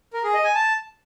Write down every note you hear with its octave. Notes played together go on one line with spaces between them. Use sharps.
A#4
G#4
D#5
G#5
A5